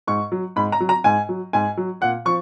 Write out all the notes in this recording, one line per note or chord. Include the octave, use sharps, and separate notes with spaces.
G#2 C#6
F#3
G#2 B5
A#5
F#3
A#5
G#2 G#5
F#3
G#2 G#5
F#3
A#2 F#5
F3 C#6